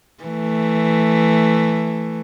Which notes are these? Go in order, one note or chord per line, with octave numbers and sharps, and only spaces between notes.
E3 A3